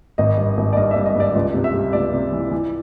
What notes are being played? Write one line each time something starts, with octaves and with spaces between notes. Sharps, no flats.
G#1 D#5
G2
G#1
D5
G2 D#5
G2 E5
D#5
G2 D5
C#2 D#5
C3
E5
G3
C#2 D5
C3
E3
E3